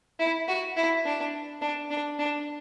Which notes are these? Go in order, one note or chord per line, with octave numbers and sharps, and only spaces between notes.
E4
F#4
E4
D4
D4
D4
D4